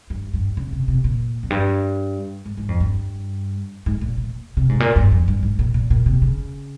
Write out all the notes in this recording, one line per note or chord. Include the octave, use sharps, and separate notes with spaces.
G2
G2
C#3
C3
C3
A#2
F2
G2
G#2
G#2
F2
G2
G#2
A#2
A#2
C3
G#2
A#2
G2
F2
G2
G#2
A#2
A#2
A#2
C3
C#3